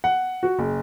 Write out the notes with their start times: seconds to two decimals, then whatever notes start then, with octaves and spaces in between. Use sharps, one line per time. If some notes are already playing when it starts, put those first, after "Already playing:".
0.04 F#5
0.43 F#4
0.59 F#1